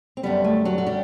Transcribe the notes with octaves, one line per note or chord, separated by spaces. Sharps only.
C4
F#2 D3 G3 B3
A3
F#3 F#4
F#4
G3 G4